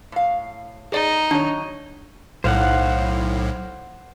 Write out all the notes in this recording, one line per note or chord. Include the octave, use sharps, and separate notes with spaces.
A2 F5
D#4 G#4 D5
D#3 F#3 D4 C#5
B1 A2 C5 F5 F#5